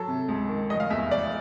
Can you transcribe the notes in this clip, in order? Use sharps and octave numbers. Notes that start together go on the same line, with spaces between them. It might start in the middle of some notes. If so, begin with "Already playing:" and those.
Already playing: F#3 A4
C3
C#2
D#3
F1 D#5
F5
E2 E5
F1 D5